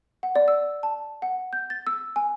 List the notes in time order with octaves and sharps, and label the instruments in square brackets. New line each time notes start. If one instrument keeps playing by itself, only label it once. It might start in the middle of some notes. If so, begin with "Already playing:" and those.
[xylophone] F#5
D5
E6
A5
F#5
G6
A6
E6
G#5